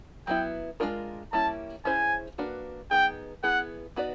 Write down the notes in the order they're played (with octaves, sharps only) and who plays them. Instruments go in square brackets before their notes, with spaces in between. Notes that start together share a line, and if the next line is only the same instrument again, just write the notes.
[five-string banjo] F#3 B3 E4 [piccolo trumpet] G5
[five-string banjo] G#3 B3 D4 F4 A#4
[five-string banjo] G3 A#3 C#4 E4 [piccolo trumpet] A5
[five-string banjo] C#4 E4 G#4 C5 [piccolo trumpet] G#5
[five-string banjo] A#3 D4 F#4 B4
[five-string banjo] F#3 B3 D#4 G#4 [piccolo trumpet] G5
[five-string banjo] B3 E4 G#4 [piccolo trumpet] F#5
[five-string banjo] B3 D#4 F#4 B4 D5